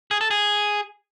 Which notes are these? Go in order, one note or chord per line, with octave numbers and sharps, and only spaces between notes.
G#4
A4
G#4